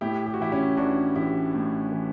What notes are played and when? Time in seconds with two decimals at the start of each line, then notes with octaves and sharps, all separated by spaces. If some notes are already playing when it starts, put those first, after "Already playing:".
0.01 A2 E4 G4
0.26 G4
0.34 F#4
0.40 E3 E4 G4
0.52 C#4 E4
0.70 G4
0.77 A1 D4 F#4
1.16 A1 E4 G4
1.54 A2
1.92 E3